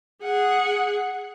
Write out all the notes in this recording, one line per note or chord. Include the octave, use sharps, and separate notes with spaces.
G#4 F#5